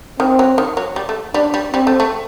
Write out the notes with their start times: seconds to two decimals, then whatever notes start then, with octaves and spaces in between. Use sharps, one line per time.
0.19 D#3 C4
0.39 F#3
0.58 D#3
0.77 F#3
0.96 G3
1.09 A3
1.34 G3 D4
1.54 G3
1.74 G3 C4
1.87 A3
2.00 A3